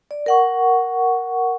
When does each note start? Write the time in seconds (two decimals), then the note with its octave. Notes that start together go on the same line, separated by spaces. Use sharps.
0.11 D5
0.26 A#4 F#5 C#6